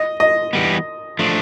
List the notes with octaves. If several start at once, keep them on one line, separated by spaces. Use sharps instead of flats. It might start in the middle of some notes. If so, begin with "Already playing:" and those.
Already playing: D#5
D#5
E3 G3 B3
F3 A3 D4